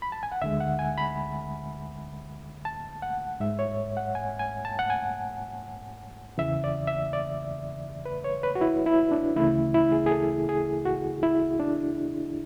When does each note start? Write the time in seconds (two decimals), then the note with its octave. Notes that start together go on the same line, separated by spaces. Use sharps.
0.02 B5
0.12 A5
0.23 G#5
0.32 F#5
0.42 D2 D3 G#3 E5
0.60 F#5
0.79 G#5
0.98 B5
2.65 A5
3.02 F#5
3.40 G#2 G#3 E5
3.59 C#5
3.97 F#5
4.15 G#5
4.39 G#5
4.65 A5
4.79 F#5
4.90 G#5
6.38 E2 C#3 E3 E5
6.64 D5
6.87 E5
7.13 D5
8.06 B4
8.24 C#5
8.43 B4
8.55 F#4
8.61 E4
8.86 E4
9.11 D4
9.36 D2 C#3 E3 A3 E4
9.74 E4
9.92 G#4
10.06 G#4
10.11 A4
10.49 G#4
10.85 F#4
11.23 E4
11.60 D4